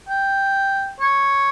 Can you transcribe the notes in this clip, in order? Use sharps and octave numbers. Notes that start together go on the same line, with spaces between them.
G5
C#5